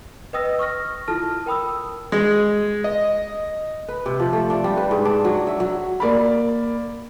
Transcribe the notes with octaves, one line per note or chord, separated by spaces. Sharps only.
B4 D#5 G5 D#6 E6 A#6
C#6 D#6 F6 A#6
E4 F4 A4 A5 F6
A#4 G5 B5 D#6 E6
G#3
D#5
B4
C3
F3
A3
D4
G3
B4
G#2
D4
F#3
E5
F#3
A#3 D5 B5